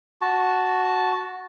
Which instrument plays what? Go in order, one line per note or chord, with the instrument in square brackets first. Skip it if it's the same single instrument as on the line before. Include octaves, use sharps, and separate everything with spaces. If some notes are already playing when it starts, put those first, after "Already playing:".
[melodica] F#4 A5